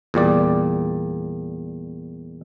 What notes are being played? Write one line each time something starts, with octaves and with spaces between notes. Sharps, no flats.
E2 A#2 G3 D5